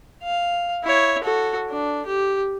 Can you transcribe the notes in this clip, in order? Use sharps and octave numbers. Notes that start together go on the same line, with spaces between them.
F5
E4 C#5
F#4 A4
D4
G4